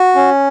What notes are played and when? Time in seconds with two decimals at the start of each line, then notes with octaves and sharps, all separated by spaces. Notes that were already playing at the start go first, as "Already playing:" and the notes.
Already playing: F#4
0.15 C#4